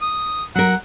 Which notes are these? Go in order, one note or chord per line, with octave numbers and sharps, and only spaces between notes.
D#6
F#3 A#4 F#5